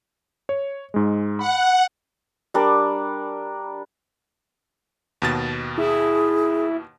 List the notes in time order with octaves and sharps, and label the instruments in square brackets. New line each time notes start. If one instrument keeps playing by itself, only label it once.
[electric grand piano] C#5
G#2 G#3
[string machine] F#5 [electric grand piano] B5
[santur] G3 D4 A#4 D5
[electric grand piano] D#2 B2 A6
[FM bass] E4 [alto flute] G#4